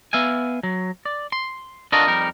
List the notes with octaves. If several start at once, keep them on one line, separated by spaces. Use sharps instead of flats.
B3 E5 F5 G#5
F#3
D5
C6
D4 F4 F#4 A4 A#4 D#5
F2 G3 D#4 A#4